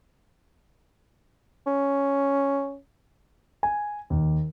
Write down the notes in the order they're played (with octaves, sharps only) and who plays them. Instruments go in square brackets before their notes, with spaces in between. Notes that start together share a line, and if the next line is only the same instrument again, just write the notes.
[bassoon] C#4
[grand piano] G#5
D#2